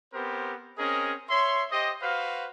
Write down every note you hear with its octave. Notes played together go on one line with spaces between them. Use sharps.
B3 C4 G4 A#4 C5
C4 C#4 G#4 A#4 D#5
C#5 E5 C6
G4 C5 D#5
F#4 B4 C5 F5